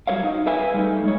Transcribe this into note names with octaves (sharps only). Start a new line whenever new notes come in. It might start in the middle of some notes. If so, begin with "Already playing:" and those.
F#3 G3 B4 C#5 F5
D#4
G#4 B4 E5 F5 G#5
G3 A3 D#4
G3 G#3 C#5